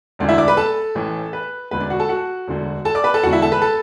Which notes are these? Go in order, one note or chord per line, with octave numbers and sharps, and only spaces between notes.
E1 D2 D3 D5
E4 E5
D5 D6
B4 B5
A4 A5
A1 A2 E3
B4
E1 D2 D3 B4
D4 D5
F#4 F#5
A4 A5
F#4 F#5
E1 D2 D3
A4 A5
D5 D6
B4 B5
A4 A5
E1 E2 D3 F#4 F#5
E4 E5
A4 A5
B4 B5
A4 A5